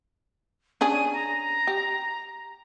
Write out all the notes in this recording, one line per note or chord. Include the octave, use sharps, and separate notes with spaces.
C#4 D4 G#4 D#7
A#5
G4